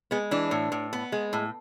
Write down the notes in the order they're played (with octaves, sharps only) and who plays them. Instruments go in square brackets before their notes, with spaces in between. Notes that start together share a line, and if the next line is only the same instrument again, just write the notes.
[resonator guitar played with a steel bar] G#3 B3
E3 D4
A2
A2
B3
G#3
A2